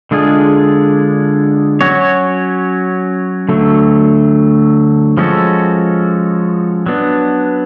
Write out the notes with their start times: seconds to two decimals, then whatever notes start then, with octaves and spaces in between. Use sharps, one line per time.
0.11 D3 G#3 D4 F4 G#4
1.81 F#3 C#4 F#4 C#5
3.49 D3 F#3 A3
5.17 F3 G#3 C#4 F#4 A4
6.86 F#3 B3 D4